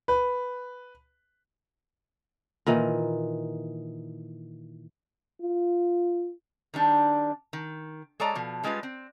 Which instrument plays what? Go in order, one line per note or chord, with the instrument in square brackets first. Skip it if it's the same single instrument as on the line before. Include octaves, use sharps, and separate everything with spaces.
[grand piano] B4
[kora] A#2 D#3 E3
[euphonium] F4
[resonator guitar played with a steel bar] D#3 G3 D4
D#3
G#3 A4 C#5 D5 A#5
B2 F3
G3 G#3 C#4 F4 B4
C4